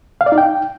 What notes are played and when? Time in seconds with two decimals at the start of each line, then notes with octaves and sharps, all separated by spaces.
0.21 F5
0.26 D5
0.32 D#4
0.38 G5